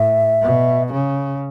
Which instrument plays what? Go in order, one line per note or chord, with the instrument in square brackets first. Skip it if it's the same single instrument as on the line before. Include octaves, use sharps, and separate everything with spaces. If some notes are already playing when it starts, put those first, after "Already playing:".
Already playing: [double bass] A2 [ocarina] E5
[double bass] B2
C#3